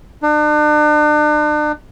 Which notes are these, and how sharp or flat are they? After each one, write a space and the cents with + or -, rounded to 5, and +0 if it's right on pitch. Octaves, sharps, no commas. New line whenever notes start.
D4 +40